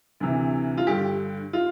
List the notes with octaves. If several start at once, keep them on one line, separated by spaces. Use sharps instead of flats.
D2 C3 E3
F4
G2 D3 G4
F4